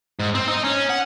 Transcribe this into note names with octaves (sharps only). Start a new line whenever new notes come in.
G#2
C4
D#4
C#4
F#5